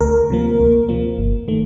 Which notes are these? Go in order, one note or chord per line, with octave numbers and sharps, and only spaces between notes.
D2 A#4
C3 F3 A#3
D2
C3 F3 A#3
G1
D#3 A3